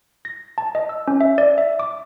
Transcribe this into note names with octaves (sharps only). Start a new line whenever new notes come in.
A#6
A5
D#5
E6
C#4
E5
D5
E5
D6